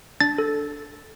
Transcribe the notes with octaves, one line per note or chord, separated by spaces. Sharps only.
D4 A6
A4